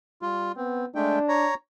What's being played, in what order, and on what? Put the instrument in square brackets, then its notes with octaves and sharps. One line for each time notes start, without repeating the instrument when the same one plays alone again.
[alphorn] G3 [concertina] F4
[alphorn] B3 [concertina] C4
[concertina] G#3 A3 G5 [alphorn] D4
[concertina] C#5 A#5